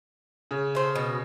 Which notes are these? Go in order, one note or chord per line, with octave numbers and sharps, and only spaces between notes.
C#3
A3 C5
B2